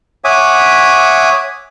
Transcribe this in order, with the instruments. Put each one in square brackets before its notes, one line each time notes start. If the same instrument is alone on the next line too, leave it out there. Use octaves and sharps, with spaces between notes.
[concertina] C#5 E5 F#5 G#5 D6 D#6